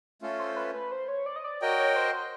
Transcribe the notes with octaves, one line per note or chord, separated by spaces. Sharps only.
A3 C#4 F4 A4
C5
B4
B4
C5
C#5
D5
D#5
D5
F#4 A#4 C#5 D#5 G5
C#5
C5